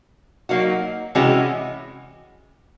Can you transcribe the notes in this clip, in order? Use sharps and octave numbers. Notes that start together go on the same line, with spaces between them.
F#3 A#3 D#4 F#4
C3 E3 G#3 C#4 F#4